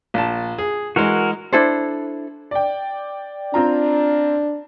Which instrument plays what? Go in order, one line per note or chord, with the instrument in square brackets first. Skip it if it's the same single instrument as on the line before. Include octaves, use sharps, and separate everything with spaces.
[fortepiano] A#1 A5
G#4
[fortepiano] E3 G#3 [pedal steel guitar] F#4 A#4
[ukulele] D4 E4 A4 C5
[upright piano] D5 G5
[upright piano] C4 F4 A#5 [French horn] D4